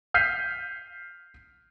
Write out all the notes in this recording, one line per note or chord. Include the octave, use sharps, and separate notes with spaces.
F6 G6 B6 C7 D#7